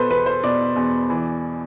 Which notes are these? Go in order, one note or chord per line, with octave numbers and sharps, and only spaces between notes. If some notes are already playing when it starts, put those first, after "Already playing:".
Already playing: B2 A4 B4 C5
E2 B4
C5
B2 D5
E2
E3